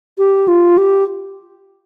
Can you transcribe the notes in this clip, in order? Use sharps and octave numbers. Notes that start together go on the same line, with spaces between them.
G4
F4
G4